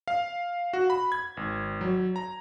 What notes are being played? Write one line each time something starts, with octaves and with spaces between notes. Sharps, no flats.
F5
F#4
B5
G#6
G#1
F#3
A#5